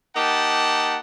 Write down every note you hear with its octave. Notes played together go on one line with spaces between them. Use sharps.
A#3 D#4 G4 F#5 A5